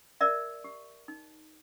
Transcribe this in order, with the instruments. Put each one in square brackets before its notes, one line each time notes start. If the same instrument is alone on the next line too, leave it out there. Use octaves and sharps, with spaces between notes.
[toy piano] A#4 D5 E5
G4
D#4